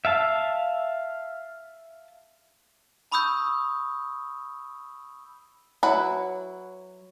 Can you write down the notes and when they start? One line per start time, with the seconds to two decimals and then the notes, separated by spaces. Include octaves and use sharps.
0.05 E5 F5 A5
3.12 A5 B5 C#6 D#6 E6 G6
5.83 F#3 E4 B4 F#5 B5